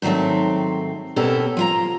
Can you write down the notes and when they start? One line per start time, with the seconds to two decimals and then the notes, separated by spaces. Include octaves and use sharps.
0.02 G#2 D#3 F#3 A3 C4
1.16 B2 A#3 C4 C#4 G4 A4
1.57 F3 F4 A#5